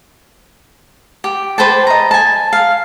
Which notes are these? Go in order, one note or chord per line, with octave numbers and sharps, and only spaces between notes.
G4
B4 C5 G5 A5
D#5 A#5
G#5 A5
F5